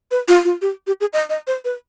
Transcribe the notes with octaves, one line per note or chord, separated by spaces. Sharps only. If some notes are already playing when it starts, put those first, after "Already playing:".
B4
F4
F4
G4
G4
G#4
D#5
D#5
C5
B4